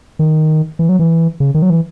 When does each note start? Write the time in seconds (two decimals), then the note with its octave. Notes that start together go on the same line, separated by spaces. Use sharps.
0.19 D#3
0.79 E3
0.89 F#3
0.99 E3
1.40 C#3
1.54 D#3
1.62 F#3
1.70 E3